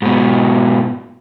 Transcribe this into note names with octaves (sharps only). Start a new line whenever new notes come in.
G#2 B2